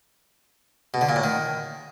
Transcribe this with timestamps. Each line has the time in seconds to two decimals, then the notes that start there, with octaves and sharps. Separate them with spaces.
0.94 B2
1.01 D3
1.09 A#2
1.16 A2
1.24 D#3